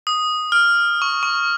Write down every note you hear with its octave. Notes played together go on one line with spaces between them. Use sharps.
D#6
F6
C#6
C#6